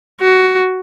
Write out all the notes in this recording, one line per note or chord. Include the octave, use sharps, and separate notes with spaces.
F#4